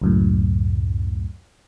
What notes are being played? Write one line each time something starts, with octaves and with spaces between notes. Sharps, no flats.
C#2 F#2 A2